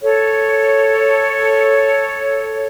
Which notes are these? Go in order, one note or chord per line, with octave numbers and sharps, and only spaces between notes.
A4 C#5